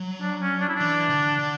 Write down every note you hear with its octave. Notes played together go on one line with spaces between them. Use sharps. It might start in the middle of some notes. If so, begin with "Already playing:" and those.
Already playing: F#3
D4
C#4
D4
E4
E3 D4
D3
D3